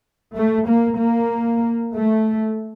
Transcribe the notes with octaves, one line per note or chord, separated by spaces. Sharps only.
A3
A#3
A#3
A3